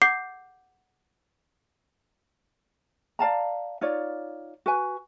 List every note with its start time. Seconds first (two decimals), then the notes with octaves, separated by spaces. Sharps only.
0.02 F#5 D6 G6 C7
3.19 D5 F5 A5 A#5
3.81 D#4 F4 C#5 D5
4.66 F#4 B4 G#5